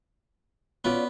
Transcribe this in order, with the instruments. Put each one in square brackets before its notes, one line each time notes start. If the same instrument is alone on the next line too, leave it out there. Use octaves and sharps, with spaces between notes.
[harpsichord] B3 [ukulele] C#4 F4 D5